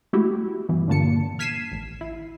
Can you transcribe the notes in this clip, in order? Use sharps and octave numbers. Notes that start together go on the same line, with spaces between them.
G#3 A3 E4 F#4 G4
G2 B2 E3
G2 A#2 D3 A#3 A5 C#7
F6 G#6 B6 C7 D#7 E7
A1
E4